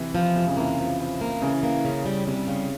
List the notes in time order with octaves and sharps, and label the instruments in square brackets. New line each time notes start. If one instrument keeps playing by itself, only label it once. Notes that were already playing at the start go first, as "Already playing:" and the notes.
Already playing: [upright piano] C3 E3
[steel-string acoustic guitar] F3
[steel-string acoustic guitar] F2 [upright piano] C3
[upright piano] C#3
[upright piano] C3 E3 [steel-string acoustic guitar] A#3
[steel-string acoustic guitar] F3
F3
A#3
[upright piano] C#3 [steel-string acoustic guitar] E3
[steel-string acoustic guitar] A#3
C#3
G3
[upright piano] C3 [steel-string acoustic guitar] G3
[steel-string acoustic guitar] C#3